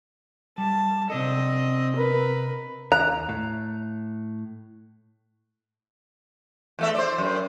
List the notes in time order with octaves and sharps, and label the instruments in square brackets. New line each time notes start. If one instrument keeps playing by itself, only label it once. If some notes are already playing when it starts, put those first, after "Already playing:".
[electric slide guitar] G3 [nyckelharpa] A5
[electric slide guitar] C3 D4 A4 [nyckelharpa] C4 D#5
[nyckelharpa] A#4 B4
[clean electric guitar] D#2 [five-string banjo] A#5 [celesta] F#6
[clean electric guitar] A2
[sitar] E2 A3 E5
C5 D5
F#2